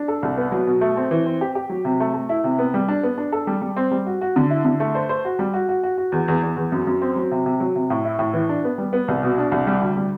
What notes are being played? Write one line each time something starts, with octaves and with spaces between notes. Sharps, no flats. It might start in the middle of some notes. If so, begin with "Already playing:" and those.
Already playing: D4
A4
C2
B3
F#3
B2
A3
C4
E3
C4
G4
G4
F#3
C3
A3
A3
E4
C3
B3
G3
D4
B3
D4
A4
G3
G3
C4
G3
F#4
F#4
D3
E4
D3
A3
C5
C5
F#4
G3
F#4
F#4
F#4
F#4
E2
E2
E2
E2
F#2
F#2
C4
F#3
C3
C3
F#3
C3
A2
E4
A2
E3
D4
B3
G3
B3
C2
B2
D4
C2
G3
D2
G3